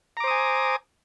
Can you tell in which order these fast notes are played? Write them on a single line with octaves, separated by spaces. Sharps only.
A#5 D6 C5 D#6 G#5